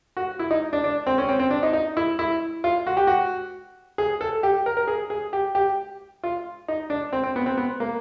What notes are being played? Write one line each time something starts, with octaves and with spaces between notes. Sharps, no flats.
F#4
E4
D#4
D4
D4
C4
C#4
C4
C4
D4
D#4
D#4
E4
E4
F4
F#4
G4
F#4
G#4
A4
G4
A#4
A#4
G#4
G#4
G4
G4
F4
D#4
D4
C4
C4
B3
C4
B3
A#3